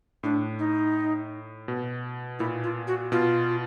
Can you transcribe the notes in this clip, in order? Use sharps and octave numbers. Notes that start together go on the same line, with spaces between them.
A2 D4
D#4
B2
A#2 E4
F4
F#4
B2 F4